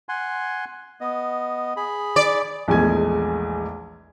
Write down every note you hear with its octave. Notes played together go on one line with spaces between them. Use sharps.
F#5 G#5 C6
B3 D#5
G#4 B5
D5
A#1 E2 G#3 A3 G#5 G#6